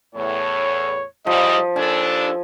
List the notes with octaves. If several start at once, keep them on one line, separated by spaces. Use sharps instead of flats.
E2 A2 C#5
G#2 E3 F3 G3 D#5
D#2 D4 A4 G#5